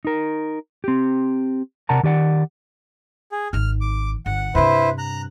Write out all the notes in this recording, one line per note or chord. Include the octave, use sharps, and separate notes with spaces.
D#4 A#4
C4 G4
C3 A#4 D5 F#5 A5 A#5
D#3 G4 D5 F#5
G#4
G#1 D#3 F6
D6
G1 F#5
G2 C3 E4 B4 C5
A#5 F#6